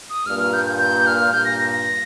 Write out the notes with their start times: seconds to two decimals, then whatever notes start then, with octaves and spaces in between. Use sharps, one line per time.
0.10 D#6
0.26 G2 A#2 F6
0.40 F6
0.53 G6
0.66 G6
0.80 G6
1.06 F6
1.32 G2 A#2 G6
1.45 A#6
1.59 A#6
1.72 A#6